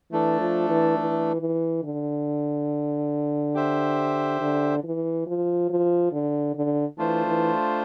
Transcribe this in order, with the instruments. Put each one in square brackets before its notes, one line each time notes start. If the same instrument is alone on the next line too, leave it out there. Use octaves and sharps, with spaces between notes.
[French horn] E3 [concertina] A3 D4 A4
[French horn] F3
E3
E3
E3
D3
[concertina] G4 C5 E5
[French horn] D3
E3
F3
F3
D3
D3
[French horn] E3 [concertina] A3 D4 F4 C5
[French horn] E3